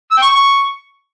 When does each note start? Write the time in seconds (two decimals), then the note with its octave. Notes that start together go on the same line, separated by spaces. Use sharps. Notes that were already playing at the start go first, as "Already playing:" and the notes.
0.11 E6
0.17 G5
0.22 C#6